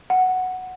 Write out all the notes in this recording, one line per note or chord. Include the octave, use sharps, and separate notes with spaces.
F#5